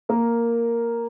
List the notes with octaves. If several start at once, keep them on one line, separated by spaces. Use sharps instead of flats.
A#3 A#4